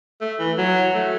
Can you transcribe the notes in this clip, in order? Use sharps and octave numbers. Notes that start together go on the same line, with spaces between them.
A3
E3
F#3
A3